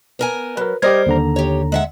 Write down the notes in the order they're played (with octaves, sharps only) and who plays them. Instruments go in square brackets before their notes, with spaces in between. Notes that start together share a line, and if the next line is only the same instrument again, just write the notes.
[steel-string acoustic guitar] B3 A#4 G#5
[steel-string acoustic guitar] F#3 [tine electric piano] A#4 B4
[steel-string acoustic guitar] G3 A#4 C5 [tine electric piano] G4 D#5 G#6
[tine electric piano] D#2 D3 A#5
[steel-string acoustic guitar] G4 C#5
G#3 E5 F#5